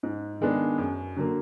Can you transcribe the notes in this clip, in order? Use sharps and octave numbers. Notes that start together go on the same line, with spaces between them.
G#2
D#3 G#3 B3 D4
F#2
D3 F#3 A#3